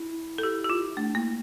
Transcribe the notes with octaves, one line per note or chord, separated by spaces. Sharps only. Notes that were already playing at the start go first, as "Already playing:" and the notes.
Already playing: E4
A4
G4
G4
F4
A3 D4
A#3 E4